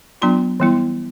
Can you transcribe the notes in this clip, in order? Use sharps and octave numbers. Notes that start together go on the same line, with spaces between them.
F#3 B3 D4 F4 C6
E3 G3 B3 E4